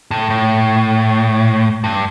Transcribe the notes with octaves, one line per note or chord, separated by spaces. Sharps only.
A2
A2
G2